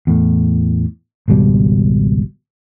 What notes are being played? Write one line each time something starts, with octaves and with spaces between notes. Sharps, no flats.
E2 A2
G#1 C#2 B2 G3